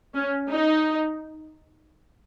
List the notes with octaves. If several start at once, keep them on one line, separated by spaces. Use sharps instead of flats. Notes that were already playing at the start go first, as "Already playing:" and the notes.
C#4
D#4